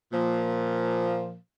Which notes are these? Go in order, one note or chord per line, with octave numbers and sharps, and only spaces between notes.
A#2 F3